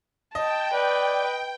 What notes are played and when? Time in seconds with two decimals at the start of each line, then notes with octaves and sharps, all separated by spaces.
0.35 D#5 G5 A5
0.74 B4 D5